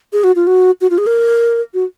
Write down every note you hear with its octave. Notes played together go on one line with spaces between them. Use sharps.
G#4
F#4
F4
F#4
F#4
F4
G#4
A#4
F#4